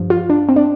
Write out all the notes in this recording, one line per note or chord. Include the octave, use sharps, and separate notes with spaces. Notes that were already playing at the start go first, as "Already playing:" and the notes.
Already playing: G2 F3
F4
D4
C4
D4